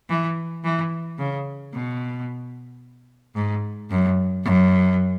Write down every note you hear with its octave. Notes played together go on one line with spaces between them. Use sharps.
E3
E3
C#3
B2
G#2
F#2
F#2